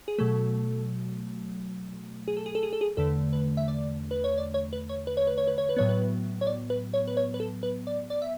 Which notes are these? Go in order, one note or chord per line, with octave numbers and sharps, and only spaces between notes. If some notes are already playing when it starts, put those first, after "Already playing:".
G#4
B2 F#3 A3 A4
G#4
A4
G#4
A4
G#4
A4
G#4
E2 D3 A3 A4
B4
E5
D5
B4
C#5
D5
C#5
B4
C#5
B4
C#5
B4
C#5
B4
C#5
B4
A2 F#3 B3 C#5
B4
C#5
D5
B4
C#5
B4
C#5
B4
A4
B4
D5
D5
E5